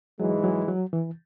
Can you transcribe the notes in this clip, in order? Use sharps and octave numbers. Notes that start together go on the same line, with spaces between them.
G#2 E3 F#3 G#3
F#3
F#3
E3